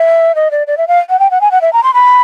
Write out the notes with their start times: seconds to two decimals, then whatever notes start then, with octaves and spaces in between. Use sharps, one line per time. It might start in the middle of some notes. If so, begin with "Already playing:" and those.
Already playing: E5
0.35 D#5
0.51 D5
0.67 D5
0.77 E5
0.88 F5
1.10 F#5
1.19 G5
1.31 F#5
1.41 G#5
1.51 F#5
1.61 E5
1.73 A#5
1.83 C6
1.94 B5